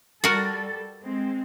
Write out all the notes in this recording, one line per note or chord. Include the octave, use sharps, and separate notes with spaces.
G3 F#4 A4 A#4
G#3 C4